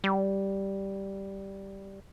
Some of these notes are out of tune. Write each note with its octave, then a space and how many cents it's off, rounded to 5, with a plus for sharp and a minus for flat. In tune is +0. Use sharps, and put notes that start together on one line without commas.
G3 -5